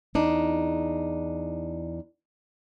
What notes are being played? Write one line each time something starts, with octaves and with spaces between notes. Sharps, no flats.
E2 D4 D#4